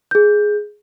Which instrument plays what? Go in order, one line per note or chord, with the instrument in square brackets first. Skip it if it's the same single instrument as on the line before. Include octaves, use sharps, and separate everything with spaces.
[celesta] G#4 G6